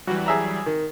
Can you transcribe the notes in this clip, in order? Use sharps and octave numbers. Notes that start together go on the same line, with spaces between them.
E3 F#3 G3 F#4
G#4 E5 A#5
D#3